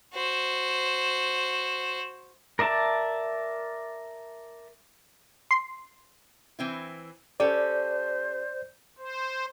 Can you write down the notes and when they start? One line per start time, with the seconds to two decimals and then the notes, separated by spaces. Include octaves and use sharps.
0.14 F#4 C5
2.59 A#4 D5 E5 A5
5.51 C6
6.59 E3 C4 E4
7.40 C#4 G4 A4 C5 D5
8.98 C5